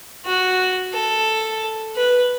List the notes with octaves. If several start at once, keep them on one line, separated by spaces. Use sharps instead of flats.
F#4
A4
B4